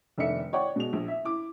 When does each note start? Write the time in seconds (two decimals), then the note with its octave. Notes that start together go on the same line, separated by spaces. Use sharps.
0.18 F1 D#3 D4 A4 E5 C#7
0.53 C#5 D5 F#5 G5 C#6
0.76 B2 G#3 F7
0.93 A#1
1.08 E5
1.25 E4 D6